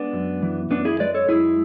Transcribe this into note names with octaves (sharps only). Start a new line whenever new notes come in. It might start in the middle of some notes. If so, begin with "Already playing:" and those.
Already playing: G#3 B3 D4
F#2
E3
F#2 B3 D4
E4 G#4
G#3 B4 D5
A4 C#5
F#2 E4 G#4